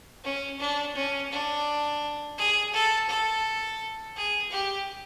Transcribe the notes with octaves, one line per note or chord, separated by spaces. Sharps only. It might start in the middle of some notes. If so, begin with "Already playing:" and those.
C#4
D4
C#4
D4
G#4
A4
A4
G#4
G4